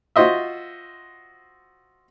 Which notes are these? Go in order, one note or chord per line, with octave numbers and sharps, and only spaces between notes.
F4 F#4 C5 D#5 E5